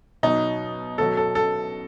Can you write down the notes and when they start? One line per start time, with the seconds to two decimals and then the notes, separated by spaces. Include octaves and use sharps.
0.23 B2 F#3 D#4
0.98 B2 F#3 A4
1.17 A4
1.35 A4